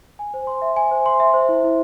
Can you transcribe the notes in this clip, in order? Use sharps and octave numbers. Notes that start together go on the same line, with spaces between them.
G#5
C5
C6
E5
G#5
C5
C6
E5
C5
E4
E4